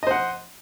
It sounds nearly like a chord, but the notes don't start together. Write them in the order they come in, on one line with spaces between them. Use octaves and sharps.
D#5 C5 F#5